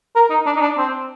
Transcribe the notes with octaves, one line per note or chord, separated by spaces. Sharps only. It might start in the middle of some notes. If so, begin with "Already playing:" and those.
A#4
D#4
D4
D#4
D4
C4